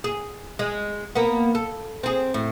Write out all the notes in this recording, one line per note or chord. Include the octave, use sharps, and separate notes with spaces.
G#4
G#3
A#3 B3
A4
C4 G#4
A2